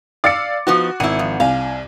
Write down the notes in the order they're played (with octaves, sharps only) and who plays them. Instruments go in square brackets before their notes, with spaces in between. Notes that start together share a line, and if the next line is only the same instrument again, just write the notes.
[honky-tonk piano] D5 F5 E6 [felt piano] D6 A6 C#7
[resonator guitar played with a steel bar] F3 B3 D#4 [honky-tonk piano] F#4
[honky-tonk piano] G#1 F#5 D#7 [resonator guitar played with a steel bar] B2 E4
[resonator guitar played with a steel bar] F3
[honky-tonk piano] C2 G#5 [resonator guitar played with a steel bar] F5